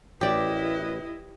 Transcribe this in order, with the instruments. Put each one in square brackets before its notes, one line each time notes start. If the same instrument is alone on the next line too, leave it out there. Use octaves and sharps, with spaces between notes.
[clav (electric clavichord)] A1 [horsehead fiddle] E4 D#5 [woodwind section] F#4 A#4 B4 [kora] G4 D5